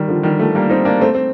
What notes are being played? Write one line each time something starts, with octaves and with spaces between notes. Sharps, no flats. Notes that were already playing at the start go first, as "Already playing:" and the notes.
Already playing: D#3 G3
D3 F3
D#3 G3
F3 A3
G3 A#3
C4 D#4
A#3 D4
A3 C4
C4